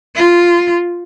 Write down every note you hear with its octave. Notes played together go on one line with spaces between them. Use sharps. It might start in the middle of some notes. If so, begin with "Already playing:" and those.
F4